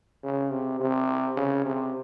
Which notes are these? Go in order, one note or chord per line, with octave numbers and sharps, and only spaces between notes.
C#3
C3
C3
C#3
C3